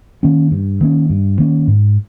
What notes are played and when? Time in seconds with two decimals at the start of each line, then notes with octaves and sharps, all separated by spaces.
0.23 D#3 A#3 C#4
0.51 G2
0.81 D#3 A#3 C#4
1.10 G2
1.38 D#3 A#3 C#4
1.68 G#2